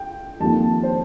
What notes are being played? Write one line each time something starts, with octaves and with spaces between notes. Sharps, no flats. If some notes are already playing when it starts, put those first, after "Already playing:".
Already playing: G5
F2 D#3 G3 A#3 A5
C5